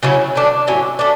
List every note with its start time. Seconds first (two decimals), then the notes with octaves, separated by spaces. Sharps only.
0.03 C#3 F#3 C#4 E4
0.36 D3 A3 D4
0.67 A2 F#3 C#4 E4
0.99 A3 D4